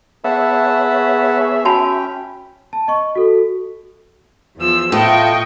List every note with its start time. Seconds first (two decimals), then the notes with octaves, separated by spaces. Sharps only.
0.24 B3 G#4 C#5 E5 F#5 A5 B5
1.65 C#4 F#4 E5 G5 A5 B5
2.73 A5
2.88 D#5 C#6
3.15 F#4 A4
4.57 E2 F3 E6
4.92 A2 F4 D#5 G5 C#6